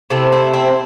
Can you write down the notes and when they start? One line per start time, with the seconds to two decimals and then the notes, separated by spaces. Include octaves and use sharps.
0.10 C3 A3 C4 E4
0.32 C4 E4
0.53 C4 E4